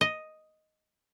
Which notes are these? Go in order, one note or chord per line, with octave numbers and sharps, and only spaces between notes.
D#5